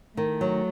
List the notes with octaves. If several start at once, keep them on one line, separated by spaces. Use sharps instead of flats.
D#3 A3
F#3